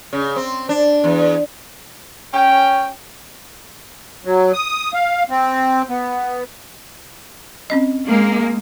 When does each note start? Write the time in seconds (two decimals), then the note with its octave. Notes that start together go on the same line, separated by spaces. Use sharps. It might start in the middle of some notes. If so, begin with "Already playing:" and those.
0.13 C#3
0.36 C4
0.69 D4
1.04 E2
2.34 C#4 G5
4.25 F#3
4.53 D#6
4.94 F5
5.30 C4
5.89 B3
7.70 C4 C#4 D#5
8.05 G#3 A#3